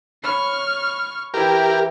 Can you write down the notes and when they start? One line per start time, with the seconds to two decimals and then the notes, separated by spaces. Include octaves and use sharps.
0.23 C#5 B5 C#6 F6
1.34 E3 E4 G4 A#4 G5